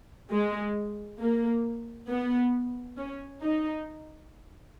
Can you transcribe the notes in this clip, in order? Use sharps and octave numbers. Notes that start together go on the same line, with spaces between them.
G#3
A#3
B3
C#4
D#4